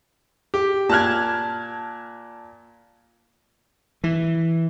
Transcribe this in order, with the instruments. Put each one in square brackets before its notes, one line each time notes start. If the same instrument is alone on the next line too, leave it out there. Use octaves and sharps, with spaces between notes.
[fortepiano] G4
[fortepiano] A#2 F#6 [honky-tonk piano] A5 F6 G#6
[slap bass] E3